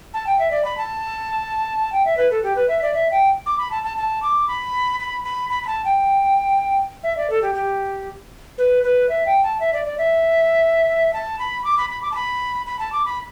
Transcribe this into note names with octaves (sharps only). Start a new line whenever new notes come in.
A5
G5
E5
D5
B5
A5
G5
E5
B4
A4
G4
B4
E5
D5
E5
G5
D6
B5
A5
A5
A5
D6
B5
B5
B5
B5
B5
A5
G5
E5
D5
A4
G4
G4
B4
B4
E5
G5
A5
E5
D5
D5
E5
A5
B5
D6
B5
B5
D6
A5
B5
B5
A5
D6
B5